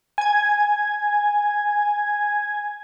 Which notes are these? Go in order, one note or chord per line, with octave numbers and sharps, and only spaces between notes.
G#5 G#6